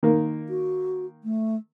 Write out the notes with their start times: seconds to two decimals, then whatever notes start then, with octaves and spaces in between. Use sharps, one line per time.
0.03 D#3 A#3
0.49 F#4
1.24 A3